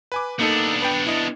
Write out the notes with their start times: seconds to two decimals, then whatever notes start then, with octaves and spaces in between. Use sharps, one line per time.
0.12 B4 G#5 D6
0.39 A#3 B3 D4 D#4 A4
0.82 B4 G5
1.07 E4 D#5